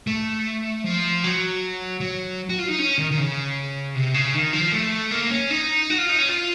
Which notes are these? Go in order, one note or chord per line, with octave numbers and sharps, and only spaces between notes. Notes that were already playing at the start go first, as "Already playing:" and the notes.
A3
F3
F#3
F#3
F#4
F4
D#4
C#4
D#3
D#3
C#3
C3
C#3
D#3
F3
A3
A#3
C#4
D#4
F#4
F4
D#4
C#4
F4